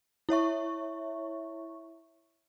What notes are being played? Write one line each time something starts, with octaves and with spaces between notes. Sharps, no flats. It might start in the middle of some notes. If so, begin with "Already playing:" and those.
E4 C#5 E5 C#6